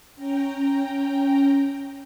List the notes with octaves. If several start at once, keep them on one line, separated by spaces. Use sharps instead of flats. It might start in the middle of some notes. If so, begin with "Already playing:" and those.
C#4 G5 A#5